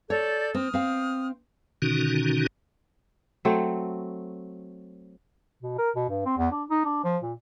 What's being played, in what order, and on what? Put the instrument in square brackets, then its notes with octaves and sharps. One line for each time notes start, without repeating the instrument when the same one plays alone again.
[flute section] A4 D5 G6 [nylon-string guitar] C#5
[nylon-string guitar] C4 [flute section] D#6 F6
[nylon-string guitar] C4 F5
[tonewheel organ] B2 D3 D#3 C#4 D#4 F#4
[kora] F#3 A3 C4
[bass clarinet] B2
A#4
B2
G2
C4
E2
D4
D#4
D4
F3
A#2